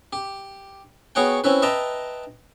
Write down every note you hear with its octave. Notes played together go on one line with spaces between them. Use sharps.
G4
B3 F#4 G#4 C#5 F#5 G5
C4 C#4 E4 B4
B4 D#5 E5 G5 A5 A#5